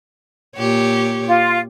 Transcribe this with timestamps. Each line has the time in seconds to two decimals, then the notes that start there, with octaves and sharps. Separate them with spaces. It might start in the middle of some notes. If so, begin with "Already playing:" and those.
0.57 A#2 G4 C#5
1.27 F4